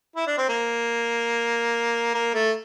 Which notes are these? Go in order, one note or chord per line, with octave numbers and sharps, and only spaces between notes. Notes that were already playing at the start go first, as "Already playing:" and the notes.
E4
D4
C4
A#3
A#3
A3